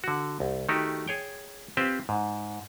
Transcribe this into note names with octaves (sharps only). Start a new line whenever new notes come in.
D3 F#4
C2
D#3 A3 D#4 F#4 G4
G#4 C#5 G5
C4 F4 G4 B4 C5
G#2